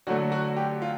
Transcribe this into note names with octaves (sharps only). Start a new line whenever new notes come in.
D3 F#3 A3 F#4
F#4
G4
F4